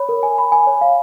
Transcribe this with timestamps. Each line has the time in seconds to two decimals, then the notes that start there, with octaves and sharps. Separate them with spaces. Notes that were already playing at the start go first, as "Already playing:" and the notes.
Already playing: C#5 B5
0.09 A#4
0.23 G#5
0.38 B5
0.52 G#5
0.67 C#5
0.81 F5